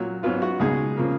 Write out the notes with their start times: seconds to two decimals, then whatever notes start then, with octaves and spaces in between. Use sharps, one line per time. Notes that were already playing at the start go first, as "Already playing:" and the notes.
Already playing: A#2 F#3 F4
0.23 G#2 F#3 B3 F4
0.42 F#4
0.60 C#2 B2 G#3 D#4 G#4
0.97 C#3 F3 A#3